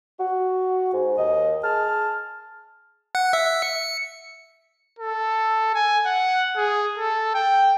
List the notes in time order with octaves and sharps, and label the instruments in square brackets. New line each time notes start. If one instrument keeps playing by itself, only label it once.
[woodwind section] F#4
G#2
D#2 D#5
G#4 A5 F6
[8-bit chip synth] F#5
E5
C#7
[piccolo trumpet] A4
G#5
F#5
G#4
A4
G5